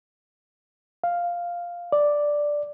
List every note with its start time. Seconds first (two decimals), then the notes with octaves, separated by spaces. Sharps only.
1.04 F5
1.92 D5